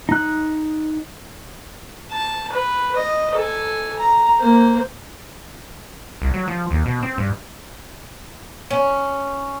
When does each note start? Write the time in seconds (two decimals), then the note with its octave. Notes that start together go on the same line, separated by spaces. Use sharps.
0.09 D#4 F#6
2.12 A5
2.53 B4
2.96 D#5
3.35 A4 G#5
3.99 A#5
4.40 A#3 C5
6.22 C2
6.34 F#3
6.48 F3
6.71 D#2
6.86 B2
7.03 C4
7.18 G2
8.70 C#4